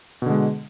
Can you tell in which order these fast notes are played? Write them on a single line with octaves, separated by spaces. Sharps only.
B2 D3 G#3